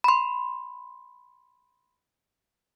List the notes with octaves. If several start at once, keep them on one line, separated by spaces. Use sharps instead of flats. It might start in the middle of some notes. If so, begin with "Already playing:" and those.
B5 C6